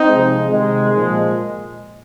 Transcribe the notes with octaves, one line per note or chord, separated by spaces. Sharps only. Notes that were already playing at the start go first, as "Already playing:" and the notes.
Already playing: C4 D#4
C3 F3 G#3
C3 D#3 G#3
A#2 F3 G#3